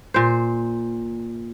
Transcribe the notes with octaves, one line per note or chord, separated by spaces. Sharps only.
A#2 C5